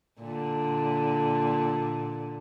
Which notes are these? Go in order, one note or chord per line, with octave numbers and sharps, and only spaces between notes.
A#2 D3